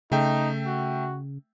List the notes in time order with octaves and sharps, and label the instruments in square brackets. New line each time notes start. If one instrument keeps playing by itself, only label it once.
[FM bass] C#3 [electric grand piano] A3 E5 G5 [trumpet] D#4
[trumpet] F#4